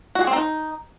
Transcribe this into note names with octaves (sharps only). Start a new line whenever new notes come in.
F#4
G#4
C4
D#4